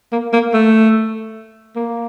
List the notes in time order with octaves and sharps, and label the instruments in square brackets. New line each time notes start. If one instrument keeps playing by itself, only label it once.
[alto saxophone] A#3
A#3
A3
A#3